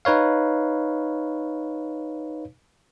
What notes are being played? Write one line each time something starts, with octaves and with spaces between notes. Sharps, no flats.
D#4 B4 C#5 F5